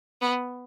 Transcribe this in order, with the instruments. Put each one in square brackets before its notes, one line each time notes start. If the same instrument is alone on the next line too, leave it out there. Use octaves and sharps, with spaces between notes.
[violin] B3